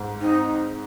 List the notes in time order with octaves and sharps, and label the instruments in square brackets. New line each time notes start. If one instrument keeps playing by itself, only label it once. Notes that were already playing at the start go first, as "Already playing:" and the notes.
Already playing: [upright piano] G#2
[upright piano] C4 [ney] D#4